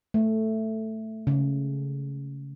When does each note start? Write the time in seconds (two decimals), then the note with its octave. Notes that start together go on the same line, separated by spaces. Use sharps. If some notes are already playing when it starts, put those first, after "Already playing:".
0.14 A3
1.27 C#3